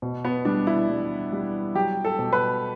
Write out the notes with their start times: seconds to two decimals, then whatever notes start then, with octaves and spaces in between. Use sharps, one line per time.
0.02 B2
0.25 B3
0.45 G3 D4
0.67 E4
0.89 G3
1.32 G3
1.75 F#3 G4
2.05 A4
2.19 B2
2.33 B4